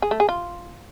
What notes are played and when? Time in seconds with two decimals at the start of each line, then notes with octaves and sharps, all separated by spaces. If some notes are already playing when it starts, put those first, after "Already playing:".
0.02 G#4
0.11 A3
0.20 G#4
0.29 F4